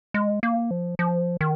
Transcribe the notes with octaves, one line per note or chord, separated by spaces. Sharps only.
G#3
A#3
F3
F3
D#3